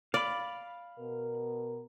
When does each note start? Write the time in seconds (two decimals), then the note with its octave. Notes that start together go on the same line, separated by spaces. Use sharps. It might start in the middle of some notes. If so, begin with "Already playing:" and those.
0.14 D5 F5 B5
0.98 B2 A#4